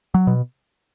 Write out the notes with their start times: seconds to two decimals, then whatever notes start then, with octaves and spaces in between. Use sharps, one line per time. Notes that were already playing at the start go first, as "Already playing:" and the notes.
0.14 F#3
0.27 B2